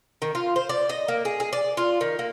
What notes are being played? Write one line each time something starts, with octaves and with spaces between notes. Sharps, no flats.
D#3
F4
C5
D5
D#5
A#3
G#4
G#4
D5
F4
D#3
A#3